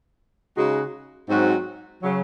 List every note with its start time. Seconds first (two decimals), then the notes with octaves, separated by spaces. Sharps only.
0.56 C#3 G#3 D#4 F#4
1.29 G#2 F#3 C4 F#4
2.03 C#3 F#3